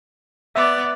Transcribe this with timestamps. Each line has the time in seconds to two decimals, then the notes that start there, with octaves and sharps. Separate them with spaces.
0.56 B3 D5 E5